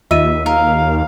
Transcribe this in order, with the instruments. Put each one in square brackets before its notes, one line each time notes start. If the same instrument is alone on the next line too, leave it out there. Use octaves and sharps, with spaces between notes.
[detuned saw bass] D#2 [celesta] F4 D#5 D#7 [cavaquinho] E5
[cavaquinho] A#4 [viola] F5